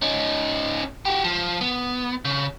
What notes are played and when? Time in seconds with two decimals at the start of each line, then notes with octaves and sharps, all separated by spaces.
0.02 C#4 D#4
1.05 F#4 G4
1.24 F3
1.61 B3
2.25 C#3